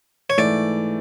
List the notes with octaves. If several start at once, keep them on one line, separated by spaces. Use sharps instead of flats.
C#5
G#2 E3 A3 D5